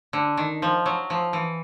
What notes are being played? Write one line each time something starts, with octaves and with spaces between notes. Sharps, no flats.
D3
D#3
F3
F#3
F3
E3